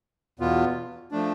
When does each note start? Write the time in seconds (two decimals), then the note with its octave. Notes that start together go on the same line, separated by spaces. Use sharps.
0.39 E2 B2 B3 F4
1.11 F3 A3 D4